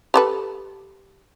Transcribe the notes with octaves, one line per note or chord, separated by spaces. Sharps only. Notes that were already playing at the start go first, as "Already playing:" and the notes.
G4 A4 B4